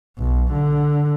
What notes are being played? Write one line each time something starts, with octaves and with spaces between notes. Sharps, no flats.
B1
D3